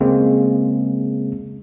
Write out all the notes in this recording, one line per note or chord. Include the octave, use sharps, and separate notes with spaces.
C#3 G#3 A#3 C4